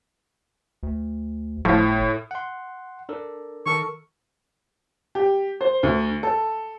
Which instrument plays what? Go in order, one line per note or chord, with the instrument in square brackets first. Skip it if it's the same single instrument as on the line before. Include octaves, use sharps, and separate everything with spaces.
[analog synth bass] D2
[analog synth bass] G1 [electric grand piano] A2 [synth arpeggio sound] F3
[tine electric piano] F#5 C6
D4 A4 A#4
[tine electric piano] D#3 A4 A#4 [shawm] C#6
[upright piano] G4
C5
D2
A4